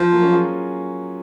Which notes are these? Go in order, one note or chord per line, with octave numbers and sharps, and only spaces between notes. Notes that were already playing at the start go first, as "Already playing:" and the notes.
Already playing: F3
F#3 A#3
A#3 C#4
F4 G#4